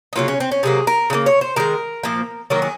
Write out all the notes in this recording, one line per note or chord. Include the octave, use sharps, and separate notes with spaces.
D#4
C#3 F#3 A#3 F4
C#4
C4
C#4
C3 F#3 A#3 G#4
A#4
C#3 F#3 A#3
C#5
C5
D#3 G#3 A#4
A#2 F3 A#3
D#3 F#3 A#3 A#4
G#4